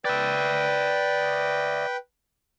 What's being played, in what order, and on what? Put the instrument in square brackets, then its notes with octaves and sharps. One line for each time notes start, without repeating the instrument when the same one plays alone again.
[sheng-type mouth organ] B4 G5 [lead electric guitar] D5 E5